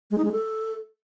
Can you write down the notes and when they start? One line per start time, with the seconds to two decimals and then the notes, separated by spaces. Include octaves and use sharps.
0.11 G#3
0.18 D#4
0.25 G#3
0.32 A4